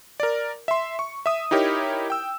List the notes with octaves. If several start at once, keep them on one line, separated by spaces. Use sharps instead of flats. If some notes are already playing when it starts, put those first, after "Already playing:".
A#4 D5
E5 C6
C#6
E5 D#6
D#4 E4 G4 A#4 C#5
G5 E6